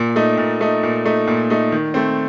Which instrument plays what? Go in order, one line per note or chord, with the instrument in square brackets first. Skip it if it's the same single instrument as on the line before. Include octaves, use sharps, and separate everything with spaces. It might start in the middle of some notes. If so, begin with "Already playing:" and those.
Already playing: [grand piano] A#2
A3 D#4
A#2
A3 D#4
A#2
A3 D#4
A#2
A3 D#4
D#3
A3 C4